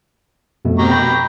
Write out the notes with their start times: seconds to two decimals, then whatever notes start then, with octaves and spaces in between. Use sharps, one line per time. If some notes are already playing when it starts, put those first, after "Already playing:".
0.65 F2 B2 A3
0.79 B2 C4 G4 A#5 C#6
0.91 B5 G6 A#6